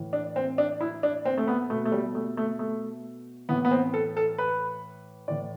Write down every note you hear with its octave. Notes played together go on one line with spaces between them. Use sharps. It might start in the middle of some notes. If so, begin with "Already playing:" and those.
Already playing: A2 E3
D4
C4
D4
E4
D4
C4
A3
B3
B2 A3
A3
G3
A3
A3
A3
A2 E3 B3
B3
C4
A4
A4
B4
A2 E3 D5